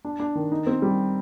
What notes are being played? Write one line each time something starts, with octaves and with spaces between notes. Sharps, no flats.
D4
D4
D#3
D#4
C4
G3